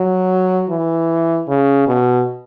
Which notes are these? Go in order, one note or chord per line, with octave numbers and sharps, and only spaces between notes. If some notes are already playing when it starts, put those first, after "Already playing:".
Already playing: F#3
E3
C#3
B2